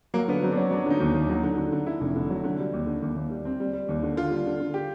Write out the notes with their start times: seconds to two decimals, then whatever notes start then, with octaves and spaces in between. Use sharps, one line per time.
0.14 F#3 A#3
0.28 D3 B3
0.43 F#3 C4
0.51 D4
0.56 F#3 C#4
0.71 F#3 D4
0.86 D3 D#4
1.00 D#2
1.14 D#2
1.29 F#3 D#4
1.43 D3
1.57 D3
1.72 D3
1.86 D3 E4
2.01 F1
2.16 D3
2.30 F#3
2.44 D3
2.59 G3
2.73 D#2
2.87 D3
3.02 D#2
3.16 D#2
3.30 G3
3.45 C4
3.60 G3
3.73 G3
3.89 D#2
4.03 D3
4.17 D3 F4
4.31 G3
4.46 D3
4.60 D3
4.74 G4